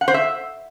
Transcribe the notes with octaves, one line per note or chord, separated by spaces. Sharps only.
F#5
C5
E5